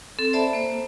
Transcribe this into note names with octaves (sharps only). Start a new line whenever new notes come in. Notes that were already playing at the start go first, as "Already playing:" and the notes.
C4 A4
C5 D5 E5 A5 B5
A#3 C5